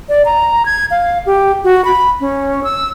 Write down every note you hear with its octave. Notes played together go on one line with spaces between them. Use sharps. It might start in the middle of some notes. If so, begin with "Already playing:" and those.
D5
A#5
G#6
F5
G4
F#4
B5
C#4
E6